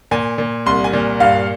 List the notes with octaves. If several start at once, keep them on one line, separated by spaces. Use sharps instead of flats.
A#2 G#5
A#2
C2 C6
G#5
A#2
G2 F5